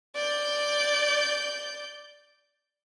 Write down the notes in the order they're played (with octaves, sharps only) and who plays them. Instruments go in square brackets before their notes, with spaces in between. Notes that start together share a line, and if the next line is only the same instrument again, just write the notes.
[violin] D5 G6